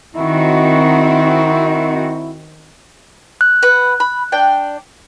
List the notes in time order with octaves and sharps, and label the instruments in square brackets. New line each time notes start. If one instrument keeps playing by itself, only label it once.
[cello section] D#3 C4 F#4 [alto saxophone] E4
[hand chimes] F#6
[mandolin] B4 F#5
B5
D4 D5 G5